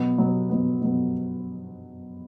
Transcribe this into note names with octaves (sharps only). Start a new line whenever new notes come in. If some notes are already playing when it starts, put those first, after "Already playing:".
Already playing: B2 F#3 B3
B2 F#3 B3
B2 F#3 B3
B2 F#3 B3